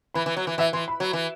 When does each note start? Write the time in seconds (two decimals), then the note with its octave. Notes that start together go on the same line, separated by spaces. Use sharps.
0.14 E3 B5
0.26 E3
0.36 F#3
0.47 E3
0.58 E3 E5
0.73 E3 C6
0.88 B5
1.00 F#3
1.13 E3